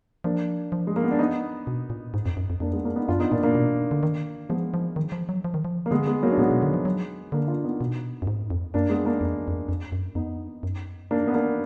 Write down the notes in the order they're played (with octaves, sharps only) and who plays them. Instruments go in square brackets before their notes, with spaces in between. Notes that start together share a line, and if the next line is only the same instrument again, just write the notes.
[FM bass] F3 [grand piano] A#3 D4
[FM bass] F3
[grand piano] G#3
A#3
B3
D4
B3 D#4
[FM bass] B2
A#2
G#2
F2
F#2
F2
[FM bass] F2 [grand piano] A#3 D4
[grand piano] G#3 B3
A#3 D4
B3 D#4
[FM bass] F#2 [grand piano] D4 F4
[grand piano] B3 D#4
[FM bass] A#2 [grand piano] A#3 D4
[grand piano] A#3 D4
[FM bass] B2
D3
D#3
[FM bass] F3 [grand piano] G#3 B3
[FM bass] F3
D#3
F3
F#3
F3
D#3
F3
[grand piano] A#3
[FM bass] D3 [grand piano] G#3 B3
[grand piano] G#3 B3
F#3 A#3
D4
[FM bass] A#2 [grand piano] G#3 B3
[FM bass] B2
D3
F3
F#3
[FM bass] D3 [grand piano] A#3 D4
[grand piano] D4 F4
B3 D#4
[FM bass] B2
F#2
G#2
F2
[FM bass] F#2 [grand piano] A#3 D4
[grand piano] G#3 B3
A#3 D4
[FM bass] F2
F2
F2
F#2
[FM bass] F2 [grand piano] B3 D#4
[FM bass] F#2
[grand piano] A#3 D4
B3
A#3 D4